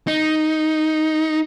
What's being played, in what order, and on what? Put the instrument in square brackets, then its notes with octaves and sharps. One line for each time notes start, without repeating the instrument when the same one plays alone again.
[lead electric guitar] D#4